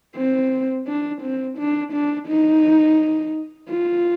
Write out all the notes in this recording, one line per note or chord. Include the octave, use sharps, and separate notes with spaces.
C4
D4
C4
D4
D4
D#4
F4